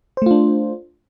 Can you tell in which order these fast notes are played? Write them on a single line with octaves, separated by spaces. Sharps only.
C5 A3 F4 D4